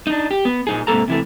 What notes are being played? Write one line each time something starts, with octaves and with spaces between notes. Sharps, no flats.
D4 D#4
G4
B3
A#2 D#4 G#4
G#2 C3 D#3 A#3 A4 A#5
C3 E3 A3